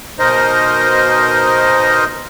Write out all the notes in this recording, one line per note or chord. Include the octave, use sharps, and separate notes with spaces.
B2 D#4 A#4 C5 D#5